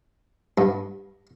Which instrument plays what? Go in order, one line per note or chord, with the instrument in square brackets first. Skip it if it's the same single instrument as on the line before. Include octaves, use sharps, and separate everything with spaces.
[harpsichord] G2